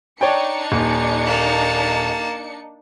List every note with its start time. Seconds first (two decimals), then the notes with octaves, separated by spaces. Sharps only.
0.21 D4 D#4 C#5 D5 G5 C#7
0.72 D#1
1.26 A#3 A5